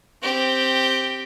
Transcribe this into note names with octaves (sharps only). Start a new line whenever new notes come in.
C4 G4